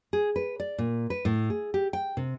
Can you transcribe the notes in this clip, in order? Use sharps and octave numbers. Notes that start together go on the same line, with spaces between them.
G#4
B4
D5
A#2
B4
A2
G#4
G4
G5
C3